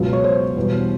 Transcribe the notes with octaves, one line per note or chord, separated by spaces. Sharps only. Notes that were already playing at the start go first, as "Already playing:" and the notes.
Already playing: C#2 B2 F#3
C#5
C5
E2 B2 G3